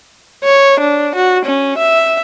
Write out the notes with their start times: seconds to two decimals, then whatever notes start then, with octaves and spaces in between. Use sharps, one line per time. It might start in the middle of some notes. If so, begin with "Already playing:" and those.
0.44 C#5
0.80 D4
1.15 F#4
1.45 C#4
1.78 E5